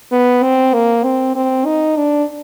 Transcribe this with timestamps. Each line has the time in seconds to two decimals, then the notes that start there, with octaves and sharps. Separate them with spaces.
0.12 B3
0.43 C4
0.73 A#3
1.04 C4
1.35 C4
1.65 D#4
1.96 D4